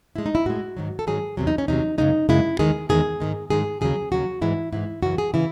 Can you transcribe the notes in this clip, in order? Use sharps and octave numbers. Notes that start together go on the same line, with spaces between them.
A2 G#3 E4
D#4
E4
A2 G#3 F#4
G#2 D#3 F#3
A4
G#2 D#3 F#3 G#4
E2 C3 F#3
D#4
C#4
E2 C3 F#3 D#4
F#2 C#3 G#3 D#4
F#2 C#3 G#3 E4
E2 D#3 G#3 G#4
E2 D#3 G#3 G#4
G#2 D#3 G#3
G#2 D#3 G#3 G#4
D#2 C#3 F#3 G#4
D#2 C#3 F#3 F#4
G#2 E3 G#3 E4
G#2 E3 G#3 E4
F#2 C#3 E3 F#4
G#4
C#3 E3 E4